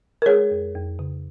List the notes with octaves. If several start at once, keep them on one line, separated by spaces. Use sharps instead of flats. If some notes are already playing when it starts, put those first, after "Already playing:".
A#4
G#3 G#4 C#5
F2
F2
C#3